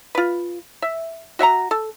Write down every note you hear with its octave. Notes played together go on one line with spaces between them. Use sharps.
F4 B4
E5
F#4 E5 F#5 A#5
A4